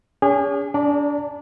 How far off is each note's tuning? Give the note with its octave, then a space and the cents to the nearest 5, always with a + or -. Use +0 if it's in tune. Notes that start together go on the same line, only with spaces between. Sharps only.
C#4 +40 G#4 -35
D4 -30 D5 +0 A#5 -40